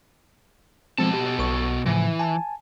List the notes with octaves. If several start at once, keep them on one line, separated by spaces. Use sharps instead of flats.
B2 F3 G#3 C4 A4 A5
G4
B1 C#6
A2 C#3 E3 F3
G#5 A5